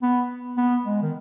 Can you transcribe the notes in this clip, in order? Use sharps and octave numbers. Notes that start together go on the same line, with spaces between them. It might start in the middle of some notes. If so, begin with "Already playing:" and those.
B3
B3
G#3
D#3